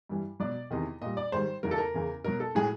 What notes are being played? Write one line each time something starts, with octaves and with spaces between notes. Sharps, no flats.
G2 E3 G3
B2 F#3 D5
E2 C3 D#3 D#5
A#2 G3 D#5
D5
G#2 D#3 G3 C5
E2 C#3 F#3 A#4
A4
A#4
E2 C#3 E3
B2 F#3 A#4
A4
A2 F#3 G#4